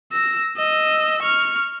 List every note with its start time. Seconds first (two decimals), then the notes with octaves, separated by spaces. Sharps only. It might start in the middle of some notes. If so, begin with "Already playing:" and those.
0.12 E6 A#6
0.57 D#5 E6
1.22 C#6 F6